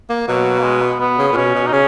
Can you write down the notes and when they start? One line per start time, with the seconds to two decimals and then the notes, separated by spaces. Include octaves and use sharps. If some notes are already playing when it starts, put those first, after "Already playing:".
0.09 A#3
0.28 B2 F#3
0.59 A#3
0.64 G#3
0.82 B3
1.00 B2 B3
1.18 C#3
1.28 B3
1.32 A#2
1.36 B2 C#4
1.54 B2
1.66 D#4
1.73 C#3 C#4